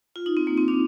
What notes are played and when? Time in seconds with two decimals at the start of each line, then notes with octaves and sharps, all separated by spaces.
0.16 F4
0.26 D#4
0.37 C4
0.47 A#3
0.58 C4
0.68 D4